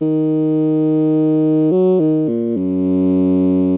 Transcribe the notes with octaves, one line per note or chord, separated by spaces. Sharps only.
D#3
F#3
D#3
A#2
F#2